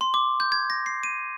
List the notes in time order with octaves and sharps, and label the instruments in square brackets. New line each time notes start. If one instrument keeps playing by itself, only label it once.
[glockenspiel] C6
D6
G6
G#6
A#6
C7
D#7